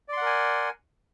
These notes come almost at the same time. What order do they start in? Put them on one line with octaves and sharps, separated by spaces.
D5 C6 F#5 A#4 G#5